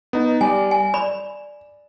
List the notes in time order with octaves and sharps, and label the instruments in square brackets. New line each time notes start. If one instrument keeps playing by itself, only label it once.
[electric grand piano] B3 D#4
[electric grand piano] G3 D5 [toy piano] G#5
[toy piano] G#5
[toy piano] D5 B5 [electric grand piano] E7